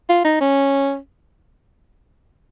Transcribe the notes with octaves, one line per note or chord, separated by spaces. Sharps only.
F4
D#4
C#4